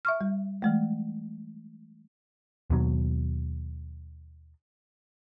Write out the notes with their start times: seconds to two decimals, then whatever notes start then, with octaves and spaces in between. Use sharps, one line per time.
0.05 E5 C#6 F6
0.21 G3
0.62 E3 G#3 A3
2.70 D#2 B2 F#3